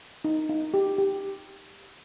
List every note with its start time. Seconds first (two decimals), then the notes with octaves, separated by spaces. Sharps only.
0.24 D#4
0.49 D#4
0.74 G4
0.98 G4